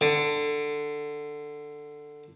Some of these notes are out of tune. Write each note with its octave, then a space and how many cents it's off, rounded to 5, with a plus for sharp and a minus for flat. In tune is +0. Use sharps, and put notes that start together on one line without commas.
D3 +10